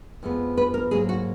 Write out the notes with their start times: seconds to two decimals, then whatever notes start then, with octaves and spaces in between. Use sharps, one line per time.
0.23 F2 F3 G#3 B3
0.57 B4
0.74 A#4
0.91 G#2 F#3 A#3 G#4
1.09 F#4